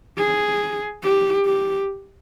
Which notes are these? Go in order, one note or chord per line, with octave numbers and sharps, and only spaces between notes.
G#4
G4
G4